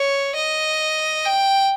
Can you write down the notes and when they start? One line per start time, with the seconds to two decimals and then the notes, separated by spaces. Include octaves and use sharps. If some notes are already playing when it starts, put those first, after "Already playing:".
Already playing: C#5
0.36 D#5
1.25 G5